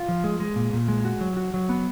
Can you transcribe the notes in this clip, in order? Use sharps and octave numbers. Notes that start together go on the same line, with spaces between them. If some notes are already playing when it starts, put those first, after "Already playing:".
Already playing: F4
F3
G#3
G#3
A#2
A#2
G#3
F#4
F#3
F#4
F#3
B3